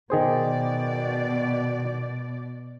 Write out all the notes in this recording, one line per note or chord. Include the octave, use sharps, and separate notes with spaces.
B2 D#3 G#4 C5 D5